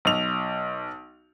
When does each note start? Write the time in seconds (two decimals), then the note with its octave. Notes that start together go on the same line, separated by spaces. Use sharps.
0.05 B1 F7